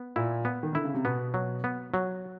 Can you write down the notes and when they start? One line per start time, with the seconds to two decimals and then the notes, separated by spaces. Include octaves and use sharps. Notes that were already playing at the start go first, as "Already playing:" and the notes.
Already playing: B3
0.16 A#2 E4
0.45 B3
0.63 D#3
0.73 D3 E4
0.84 C#3
0.94 C3
1.05 B2 B3
1.34 F#3
1.64 B3
1.94 F#3